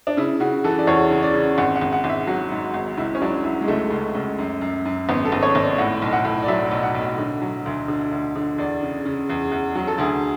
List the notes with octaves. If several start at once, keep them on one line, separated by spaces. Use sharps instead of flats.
D4
C#3 E4
C#3 F#4
E3 A4
D5
E2 C#5
C#3
D5
C#3
G#1 F#5
F#5
G#1
F#5
G#1
E5
F#3 F#4
G#2
G#1
C#2 E4
C#4
F#3 D4
F#3 E4
G#3
C#2 A3
C#2
C#2
F#2
F#2
F#2
G#1 B3
A4
G#1
C#5
G#1
D5
A2 F#5
B1
F#5
A2
D5
F#3 E5
B1
F#5
B1
D3
F#3
D2
D3
D2
D3
E2 D5
C#3
C#3
E2
E2
F#3
A4
D2 G#4